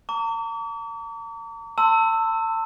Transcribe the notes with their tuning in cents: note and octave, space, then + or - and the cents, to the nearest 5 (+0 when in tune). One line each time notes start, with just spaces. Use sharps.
A#5 -40 D6 -45
A5 +35 C6 +5 E6 +0